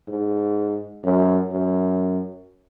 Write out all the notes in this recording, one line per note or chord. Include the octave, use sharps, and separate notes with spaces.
G#2
F#2
F#2